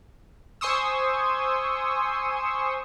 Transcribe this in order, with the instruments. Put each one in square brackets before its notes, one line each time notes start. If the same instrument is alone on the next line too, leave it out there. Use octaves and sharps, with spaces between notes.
[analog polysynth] C5 G#5 C6 C#6 D#6 E6